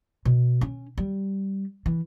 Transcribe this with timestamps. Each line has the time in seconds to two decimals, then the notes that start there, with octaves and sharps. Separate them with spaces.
0.25 B2
0.61 C#4
0.98 G3
1.86 E3